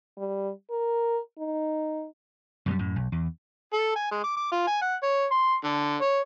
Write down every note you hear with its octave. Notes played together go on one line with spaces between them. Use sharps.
G3
A#4
D#4
F#2 B2 F3 G3
F#2 A2
B1
E2
A4
G#5
G#3
D6
D6
F4
G#5
F#5
C#5
C6
D3
C#5